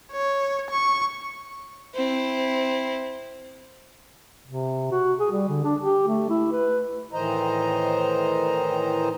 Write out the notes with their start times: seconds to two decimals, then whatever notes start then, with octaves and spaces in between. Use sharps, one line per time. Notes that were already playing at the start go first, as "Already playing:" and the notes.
0.12 C#5
0.70 C#6
1.95 C4 E4
4.46 C3
4.91 F#4
5.20 G#4
5.31 G3
5.48 D3
5.64 D4
5.79 G4
6.08 A3
6.30 E4
6.52 B4
7.13 A2 D#3 E3 C5 D#5 A#5